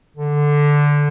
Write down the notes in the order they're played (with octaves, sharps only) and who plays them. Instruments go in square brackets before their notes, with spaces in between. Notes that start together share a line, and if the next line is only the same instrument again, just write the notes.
[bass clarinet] D3